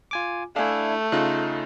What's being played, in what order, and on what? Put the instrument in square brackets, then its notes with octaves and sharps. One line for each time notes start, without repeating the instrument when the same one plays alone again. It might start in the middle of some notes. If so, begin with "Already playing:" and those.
[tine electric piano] F4 G#5 D6
[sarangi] A3 [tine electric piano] D4 E4 [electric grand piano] F5 G#5
[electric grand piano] C#3 D#4 F4 [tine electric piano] F#6